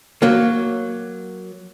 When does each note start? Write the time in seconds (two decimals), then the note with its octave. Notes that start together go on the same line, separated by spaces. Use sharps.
0.22 F#3 A#3